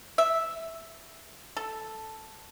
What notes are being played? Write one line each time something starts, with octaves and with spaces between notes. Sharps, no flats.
E5
A4